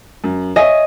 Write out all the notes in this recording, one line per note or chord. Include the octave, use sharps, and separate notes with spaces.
F#2
C#5 D#5 E5 G#5